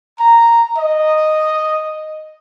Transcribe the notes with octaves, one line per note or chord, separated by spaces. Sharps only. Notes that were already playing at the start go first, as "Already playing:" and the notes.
A#5
D#5